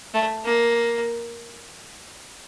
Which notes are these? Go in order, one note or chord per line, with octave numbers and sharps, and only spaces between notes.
A3
A#3